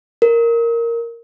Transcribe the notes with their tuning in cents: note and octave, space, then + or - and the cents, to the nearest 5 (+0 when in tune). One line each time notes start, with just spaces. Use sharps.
A#4 -5